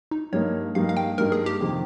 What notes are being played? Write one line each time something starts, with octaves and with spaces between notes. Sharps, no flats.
D#4
G2 G3 A#3 D#4 C#5
G2 G3 A#3 D#4 F5
F5
G5
G2 G3 A#3 D#4 A#4
G#4
G4
F2 C3 D#3